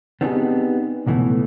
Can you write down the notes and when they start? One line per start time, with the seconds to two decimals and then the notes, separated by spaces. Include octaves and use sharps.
0.21 B3 C4 D4 D#4 G4 G#4
1.07 C#2 B2 E3 G#3 A3